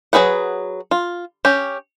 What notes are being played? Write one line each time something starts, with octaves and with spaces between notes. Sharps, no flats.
F#3 E4 G#4 B4 F#5
F4
C#4 G4